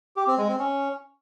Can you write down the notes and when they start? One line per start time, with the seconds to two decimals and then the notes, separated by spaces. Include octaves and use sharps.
0.16 G4
0.27 C4
0.38 G#3
0.48 C4
0.59 C#4